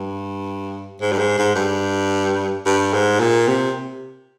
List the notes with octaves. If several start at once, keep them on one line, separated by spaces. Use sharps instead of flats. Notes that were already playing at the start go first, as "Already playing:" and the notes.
Already playing: G2
G#2
G2
G#2
G#2
G2
G2
G#2
A#2
C3